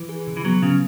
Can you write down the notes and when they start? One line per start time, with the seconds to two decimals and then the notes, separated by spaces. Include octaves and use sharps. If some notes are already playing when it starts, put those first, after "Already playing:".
Already playing: E3
0.09 G#4
0.27 C#3
0.37 E3
0.45 F#3 B3
0.63 C#3 F#3